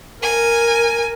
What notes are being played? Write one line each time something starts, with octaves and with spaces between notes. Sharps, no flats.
A#4 G#5